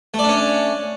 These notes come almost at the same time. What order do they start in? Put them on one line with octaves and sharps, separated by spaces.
A3 D5 D4 C#4